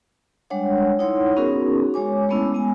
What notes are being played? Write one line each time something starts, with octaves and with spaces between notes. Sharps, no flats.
G3 G#3 D4 C#5 F#5
D#4 E4 C#5 F#5 C6
B3 C#4 D#4 F#4 G#4 A#4
G#3 C#5 G#5 D6
G#3 A3 B3 C#4 E4
G#3 B3 G#5